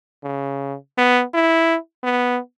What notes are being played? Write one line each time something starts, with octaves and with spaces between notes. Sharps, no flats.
C#3
B3
E4
B3